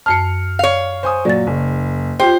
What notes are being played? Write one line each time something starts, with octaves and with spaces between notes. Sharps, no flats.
F#2 A5 F6 C7 C#7
C#5 F5
C5 G#5 D#6
A#2 F#3 D5 A6
F#1
F4 G4 C5 G5